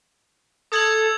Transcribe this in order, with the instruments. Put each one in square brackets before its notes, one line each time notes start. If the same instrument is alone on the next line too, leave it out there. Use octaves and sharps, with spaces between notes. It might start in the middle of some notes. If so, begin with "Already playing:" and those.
[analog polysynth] A4 [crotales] D#6 G#6 F#7